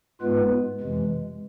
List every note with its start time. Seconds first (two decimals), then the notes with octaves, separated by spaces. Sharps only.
0.21 G#2 G#3 B3 F4 B4
0.80 F2 C3 E3 G#3